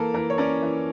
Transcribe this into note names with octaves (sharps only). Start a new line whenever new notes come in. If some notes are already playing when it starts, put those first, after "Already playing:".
Already playing: E3 A#3 A4 A#4
E3 A#4
C#5
C#4 A#4 D5
E3